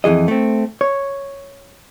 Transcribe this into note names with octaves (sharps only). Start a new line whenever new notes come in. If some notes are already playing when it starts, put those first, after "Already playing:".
F2 E3 G#4 D#5
A3 C4
C#5